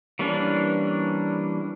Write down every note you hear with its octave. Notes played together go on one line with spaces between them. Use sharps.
E3 G3 A#3 C#4 D4